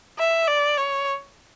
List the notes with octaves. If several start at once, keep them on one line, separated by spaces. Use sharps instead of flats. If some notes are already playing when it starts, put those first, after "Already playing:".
E5
D5
C#5